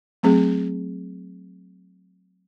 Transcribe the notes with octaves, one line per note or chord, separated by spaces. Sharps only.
F#3 A3 C4 G#4